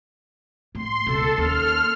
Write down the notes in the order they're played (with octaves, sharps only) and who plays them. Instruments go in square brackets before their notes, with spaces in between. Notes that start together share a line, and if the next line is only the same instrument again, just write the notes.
[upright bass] A2 [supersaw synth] C6
[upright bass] C#2 B2 [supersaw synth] A4
[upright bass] D#2 C#4 [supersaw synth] F6